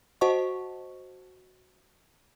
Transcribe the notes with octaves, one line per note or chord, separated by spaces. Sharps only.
F#4 C5 D#5 F#5 A5 C#6